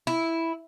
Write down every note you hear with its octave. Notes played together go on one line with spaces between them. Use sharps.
E4